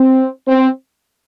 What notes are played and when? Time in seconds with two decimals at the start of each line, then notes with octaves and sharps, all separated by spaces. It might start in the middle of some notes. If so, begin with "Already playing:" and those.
Already playing: C4
0.46 C4